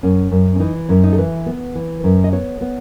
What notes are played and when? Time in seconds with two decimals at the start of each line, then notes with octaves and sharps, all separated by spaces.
0.03 F#2 C#4
0.31 F#2
0.56 C#4
0.60 E3 D#4
0.88 F#2 C#4
1.04 D#4
1.13 A4
1.18 E3 B4
1.46 B3
1.75 E3
2.04 F#2
2.24 D#5
2.32 B3 C#5
2.61 B3